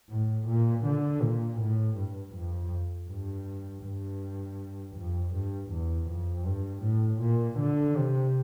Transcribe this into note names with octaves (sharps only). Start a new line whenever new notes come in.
A2
A#2
D3
A#2
A2
G2
F2
G2
G2
F2
G2
E2
F2
G2
A2
A#2
D3
C3